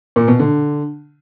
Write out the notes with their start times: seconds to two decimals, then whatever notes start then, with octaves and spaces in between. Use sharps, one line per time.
0.16 A#2
0.28 B2
0.39 D3